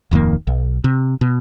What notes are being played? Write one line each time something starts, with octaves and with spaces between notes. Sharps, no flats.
D1 F2 D#3 A#3
B1
C3
B2